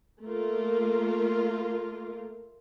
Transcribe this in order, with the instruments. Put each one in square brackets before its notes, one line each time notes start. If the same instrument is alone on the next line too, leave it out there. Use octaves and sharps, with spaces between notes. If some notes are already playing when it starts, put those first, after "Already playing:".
[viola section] A3 A#3 F4 A#4